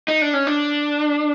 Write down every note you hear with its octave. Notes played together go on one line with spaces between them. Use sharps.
D#4
D4
C#4
D4